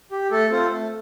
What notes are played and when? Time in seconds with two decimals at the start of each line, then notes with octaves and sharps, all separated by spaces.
0.12 G4
0.31 A3 A4
0.51 C4 F4 A4
0.72 A3